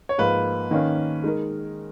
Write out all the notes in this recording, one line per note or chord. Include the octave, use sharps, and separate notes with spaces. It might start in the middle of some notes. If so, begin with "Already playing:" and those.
C#5
G#2 F3 A#3 B4
D#3 A#3 C#4
G#3 D#4 A#4